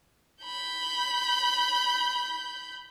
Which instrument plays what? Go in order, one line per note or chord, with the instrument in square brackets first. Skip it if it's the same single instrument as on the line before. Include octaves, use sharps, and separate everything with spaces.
[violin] B5 G6